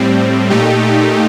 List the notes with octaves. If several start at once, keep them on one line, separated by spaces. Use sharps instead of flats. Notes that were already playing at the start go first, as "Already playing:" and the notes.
Already playing: A2 G3 C4
A#2 A3 D#4 G4